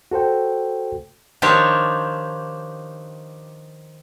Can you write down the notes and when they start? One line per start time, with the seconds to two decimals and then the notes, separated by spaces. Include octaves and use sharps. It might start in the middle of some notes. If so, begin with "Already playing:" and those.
0.11 F#4 A4 C5 G5
1.42 D#3 F3 D4 G4 C#5